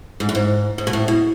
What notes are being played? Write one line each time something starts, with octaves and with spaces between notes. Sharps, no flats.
G#2
F#2
G#2
G#2
B2
A2
B2